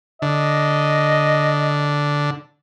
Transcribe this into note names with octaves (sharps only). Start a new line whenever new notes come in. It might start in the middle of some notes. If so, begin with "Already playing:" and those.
D3 D#5